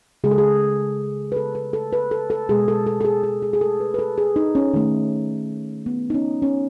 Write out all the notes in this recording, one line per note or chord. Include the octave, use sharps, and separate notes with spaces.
C#3 G#3 G#4
A4
G#4
B4
A4
B4
A4
B4
A4
A4
B2 G#3 G#4
A4
A4
A4
G#4
G#4
G#4
G#4
A4
B4
B4
A4
G#4
D#4
C#4
D#3 A3
B3
D#4
C#4
C#4